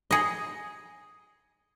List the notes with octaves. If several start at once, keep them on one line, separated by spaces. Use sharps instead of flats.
G#4 D#5